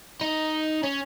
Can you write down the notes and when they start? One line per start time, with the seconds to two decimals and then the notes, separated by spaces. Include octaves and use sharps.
0.21 D#4
0.83 C#4